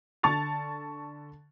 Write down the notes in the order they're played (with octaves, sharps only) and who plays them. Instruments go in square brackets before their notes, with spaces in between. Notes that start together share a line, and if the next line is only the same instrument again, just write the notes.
[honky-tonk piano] D3 A5 C#6 A6 F7